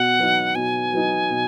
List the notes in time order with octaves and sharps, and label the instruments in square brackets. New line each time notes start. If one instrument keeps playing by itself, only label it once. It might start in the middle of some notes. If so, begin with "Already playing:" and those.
Already playing: [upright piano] B2 [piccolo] F#5
[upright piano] F#3 B3 D#4
[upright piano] B2 [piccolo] G#5
[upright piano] F#3 B3 D#4
B2